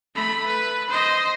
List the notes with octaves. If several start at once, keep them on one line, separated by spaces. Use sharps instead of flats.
A3 B5
B4
C5 D#5